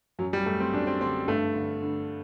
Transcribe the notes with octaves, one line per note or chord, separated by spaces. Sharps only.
F#2 F#3
G3
F#2 A3
C4
F#2 D4
C4
D3 C4
G2 A3
D3
D3